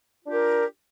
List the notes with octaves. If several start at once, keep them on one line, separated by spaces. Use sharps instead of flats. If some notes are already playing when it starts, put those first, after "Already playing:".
D4 F4 G4 A#4